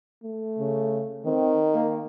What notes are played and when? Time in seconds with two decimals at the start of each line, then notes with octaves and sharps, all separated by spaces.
0.23 A3
0.59 C#3
1.25 D#3 C4
1.74 A#3